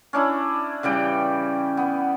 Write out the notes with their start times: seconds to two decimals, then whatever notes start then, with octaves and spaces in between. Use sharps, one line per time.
0.13 C#4 D4 E4
0.83 C#3 E3 G3 G5
1.77 B3